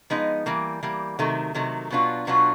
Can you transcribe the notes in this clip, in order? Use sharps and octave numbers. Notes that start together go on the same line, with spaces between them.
F3 G#3 B3 D#4
E3 G3 A#3
E3 G3 A#3
C3 D#3 F#3 A3
C3 D#3 F#3 A3
B2 F#3 B3 D4 F4
B2 F#3 B3 D4 F4